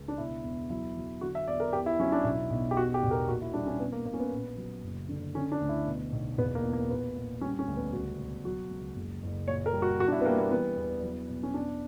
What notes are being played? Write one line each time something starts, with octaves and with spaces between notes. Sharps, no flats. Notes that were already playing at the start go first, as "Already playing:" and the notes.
Already playing: C#2
D4
B2 E4
E2
F#3 E4
F#3
D3 F#4
E5
E2 D5
A#4
E2 G4
E4
F#3 C#4
D4
B1 E4
B1
G4
E2 F#4
G4
E1
A#4
A#2 F#4
E4
G3 D4
C#4
B2 B3
A#3
B2 A#3
C#4
B3
A#1
F#3
F#1
D3
D3 C#4
D4
D2
E4
B2
B1
E1 B3
A#3
E2
A#3
A#2 B3
A#2
G3 C#4
C#4
D2
B3
C#2 F#4
B2
F#3 F#4
C#2
F#1
F#1
A#2 C#5
A#4
G3
F#4
B2 F#4
D4
E4
B3
G3 A#3
A#3
E3 B3
E2
F#3
B2
C#4
E2 D4